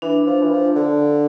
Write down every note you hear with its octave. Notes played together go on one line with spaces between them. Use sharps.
E3 D4
F3
E3
F3
D3